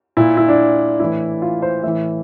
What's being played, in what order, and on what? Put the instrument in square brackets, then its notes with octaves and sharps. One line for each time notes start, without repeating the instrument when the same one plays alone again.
[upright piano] A#2 E4
E4
D4
A2 E3 E4
F4
C5
A2 E3 E5